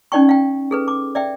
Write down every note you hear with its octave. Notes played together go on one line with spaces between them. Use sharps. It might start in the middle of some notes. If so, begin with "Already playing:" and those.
C#4 D#4 D5 G5 C#6
F5 G5
G#4 A4 B4
D6
D5 E5 G5